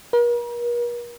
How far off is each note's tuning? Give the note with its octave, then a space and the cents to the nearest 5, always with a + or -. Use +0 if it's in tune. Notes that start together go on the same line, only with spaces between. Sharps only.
A#4 +45